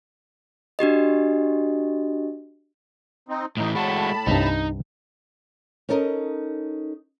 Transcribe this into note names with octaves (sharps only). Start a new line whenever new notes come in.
D4 F#4 G4 D#5
C4 D#4
A2 E3 D#4
A2 G#3 F#4 A5 B5
C2 G2 D#4
C#4 D#4 A4 A#4 D#5